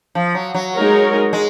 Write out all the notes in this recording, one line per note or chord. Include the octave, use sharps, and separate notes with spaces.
F3
F#3
F#3
G#3 D#4 A#4 C#5
G#3